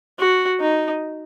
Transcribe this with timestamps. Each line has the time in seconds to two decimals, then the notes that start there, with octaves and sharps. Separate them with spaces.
0.19 F#4
0.60 D#4